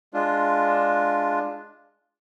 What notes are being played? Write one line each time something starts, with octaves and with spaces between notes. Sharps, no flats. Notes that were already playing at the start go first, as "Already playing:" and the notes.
G#3 D4 F4